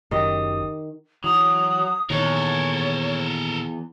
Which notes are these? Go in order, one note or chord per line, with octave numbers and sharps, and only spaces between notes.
F#1 D#3 G4 D#5 D#6
E3 F#3 D#6
E2 A#2 D#3 A4 A#4 C#5